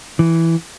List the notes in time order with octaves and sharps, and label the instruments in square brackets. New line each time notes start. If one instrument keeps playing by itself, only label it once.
[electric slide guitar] E3